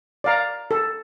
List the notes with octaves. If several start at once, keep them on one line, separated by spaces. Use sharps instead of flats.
D5 F5 A#5
A4